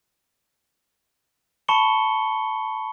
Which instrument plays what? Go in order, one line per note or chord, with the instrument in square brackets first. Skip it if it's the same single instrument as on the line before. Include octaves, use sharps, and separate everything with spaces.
[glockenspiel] A5 B5 C#6 C#7 G7